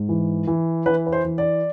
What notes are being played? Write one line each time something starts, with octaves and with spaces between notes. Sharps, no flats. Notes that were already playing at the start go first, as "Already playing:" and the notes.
Already playing: G#2
E3
E3
E3 B4
B4
C5
E3
D5